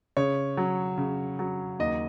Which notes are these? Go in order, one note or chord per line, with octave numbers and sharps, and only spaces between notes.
C#3 C#5
F#3
C#3
F#3
D#2 D#5